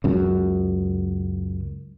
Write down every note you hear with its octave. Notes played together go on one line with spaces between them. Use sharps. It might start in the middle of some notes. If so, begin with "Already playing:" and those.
C#2 F#2